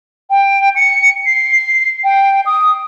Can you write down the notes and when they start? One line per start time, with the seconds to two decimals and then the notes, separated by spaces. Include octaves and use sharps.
0.30 G5
0.76 C#7
1.26 C7
2.04 G5
2.46 D#6